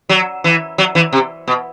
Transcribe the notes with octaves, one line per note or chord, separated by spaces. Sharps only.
F#3
E3
F#3
E3
C3
B2